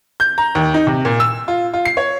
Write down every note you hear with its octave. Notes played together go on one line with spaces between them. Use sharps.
G6
A#5
D#2
D#4
C3
A#2
E6
F4
F4
C7
C#5